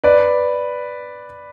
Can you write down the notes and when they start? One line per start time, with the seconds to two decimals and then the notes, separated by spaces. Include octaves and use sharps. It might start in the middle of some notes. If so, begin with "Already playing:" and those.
0.04 B4 D5